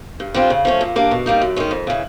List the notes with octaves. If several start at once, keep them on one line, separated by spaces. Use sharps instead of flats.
G2
D3 G3 C4 F4
C#3
F3 A3 C#4
A#2
G3 A#3 D4
B2
G3 A#3 D#4
F#2
D#3 G#3 C#4
F2
C#3 E3